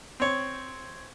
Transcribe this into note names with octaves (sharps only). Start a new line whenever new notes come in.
C4 C#5